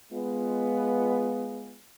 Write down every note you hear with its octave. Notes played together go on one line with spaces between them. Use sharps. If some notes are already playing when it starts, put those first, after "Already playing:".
G#3 B3 F4